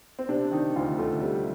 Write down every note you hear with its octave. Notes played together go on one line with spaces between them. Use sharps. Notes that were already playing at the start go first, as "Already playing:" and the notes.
C4
C3 D4
D#3 D#4
D2 F4
D2 A3
C3 G3